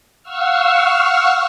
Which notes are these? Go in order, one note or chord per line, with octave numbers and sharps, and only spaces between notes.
F5 F#5 C#6 E6 F6